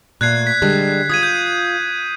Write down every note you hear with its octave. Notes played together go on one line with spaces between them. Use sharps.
A#2 A3 F#6 G#6 C7
B6
D3 G3 G#3
F4 D#6 G#6 D#7
G6